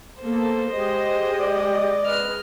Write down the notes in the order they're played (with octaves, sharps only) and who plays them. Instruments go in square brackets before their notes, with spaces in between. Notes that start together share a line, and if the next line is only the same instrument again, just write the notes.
[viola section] A#3 B3 A4 [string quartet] C5
[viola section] G#3 D#5 [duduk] G4
[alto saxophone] D5
[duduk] B4 [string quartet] F6